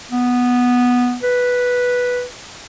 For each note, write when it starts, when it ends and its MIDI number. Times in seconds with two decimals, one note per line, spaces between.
0.11 1.16 59
1.23 2.24 71